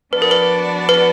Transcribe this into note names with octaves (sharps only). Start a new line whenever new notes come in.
F3 B3 D4 F#4 B4 D5
A#4
B4
B4